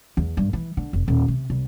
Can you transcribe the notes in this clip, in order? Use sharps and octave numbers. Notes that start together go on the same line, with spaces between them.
E2
G2
E3
D3
F1
D#1
C3
C2